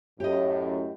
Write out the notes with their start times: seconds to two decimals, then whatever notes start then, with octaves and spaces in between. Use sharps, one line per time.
0.20 F#2 A2 G4 D#5